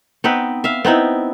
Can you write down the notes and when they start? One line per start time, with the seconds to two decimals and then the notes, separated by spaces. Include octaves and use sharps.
0.24 B3 C4 D#4 B4
0.64 E5 F5
0.85 B3 C4 D#4 E4